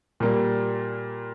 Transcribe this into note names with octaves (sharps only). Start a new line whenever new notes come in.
A#2 G3 A#3